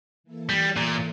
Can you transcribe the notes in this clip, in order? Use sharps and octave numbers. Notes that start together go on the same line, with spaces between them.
E3 A#3 E4 A4
G3
A#2